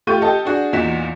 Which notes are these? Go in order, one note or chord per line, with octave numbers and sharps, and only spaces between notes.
A3 F4 G4 C#6 G6 D#7
G4 A4 D#5 A5
D4 F#4 G#4
E2 A#2 D#4 F#4 B6 E7